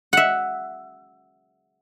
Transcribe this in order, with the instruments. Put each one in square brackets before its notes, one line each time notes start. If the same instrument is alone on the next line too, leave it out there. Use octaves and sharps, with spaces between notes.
[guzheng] E5 F#5